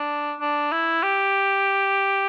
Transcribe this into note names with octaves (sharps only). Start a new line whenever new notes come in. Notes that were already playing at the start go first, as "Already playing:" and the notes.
Already playing: D4
D4
E4
G4